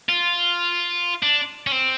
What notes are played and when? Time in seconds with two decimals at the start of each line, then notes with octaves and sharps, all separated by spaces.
0.09 F4
1.23 D4
1.67 C#4
1.72 C4